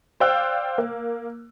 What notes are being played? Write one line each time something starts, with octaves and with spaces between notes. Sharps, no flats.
C5 D5 F5 G5 E6 F#6
A#3